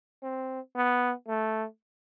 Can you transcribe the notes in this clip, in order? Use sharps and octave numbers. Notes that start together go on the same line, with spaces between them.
C4
B3
A3